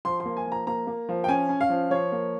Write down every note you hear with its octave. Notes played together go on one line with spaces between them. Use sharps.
F3 C6
C6
A#3
G#5
F3
A#5
A#3 A#5
A#3
F3
G5
C#4 G#5
C#4
F5
F3
F3 C#5
A#3